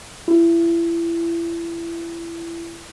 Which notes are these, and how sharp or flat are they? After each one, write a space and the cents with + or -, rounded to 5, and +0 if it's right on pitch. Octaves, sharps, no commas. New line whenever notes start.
E4 +30